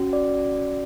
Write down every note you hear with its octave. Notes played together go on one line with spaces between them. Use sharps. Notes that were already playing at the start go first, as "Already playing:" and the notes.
Already playing: C#4 F#4
D5